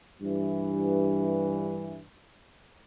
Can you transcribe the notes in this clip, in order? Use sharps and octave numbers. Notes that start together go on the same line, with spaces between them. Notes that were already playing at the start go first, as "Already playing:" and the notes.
G2 E3